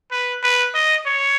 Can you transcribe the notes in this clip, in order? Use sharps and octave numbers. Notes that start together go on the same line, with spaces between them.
B4
B4
D#5
C#5